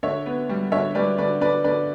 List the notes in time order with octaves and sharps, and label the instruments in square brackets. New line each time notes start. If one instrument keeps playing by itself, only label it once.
[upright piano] D3 C#5 E5
B3
G3
D3 C#5 E5
G3 B4 D5
D3 B4 D5
D3 B4 D5
D3 B4 D5